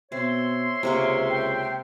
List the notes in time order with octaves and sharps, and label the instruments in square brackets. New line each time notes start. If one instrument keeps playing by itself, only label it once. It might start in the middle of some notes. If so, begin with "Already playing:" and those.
[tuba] B2 [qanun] C4 [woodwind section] C#5 E5 C6
[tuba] C#2 [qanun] C3 A#3 C#6
[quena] G5